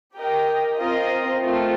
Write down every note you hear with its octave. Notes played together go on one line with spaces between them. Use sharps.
G4 A#4 D#5 G5
C4 F4 A#4 D#5
A3 C4 F4